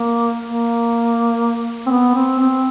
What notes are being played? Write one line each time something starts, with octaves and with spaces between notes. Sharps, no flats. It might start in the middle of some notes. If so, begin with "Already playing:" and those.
Already playing: A#3
A#3
C4
B3
C4
C4